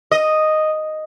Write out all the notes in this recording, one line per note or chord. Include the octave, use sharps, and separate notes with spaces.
D#5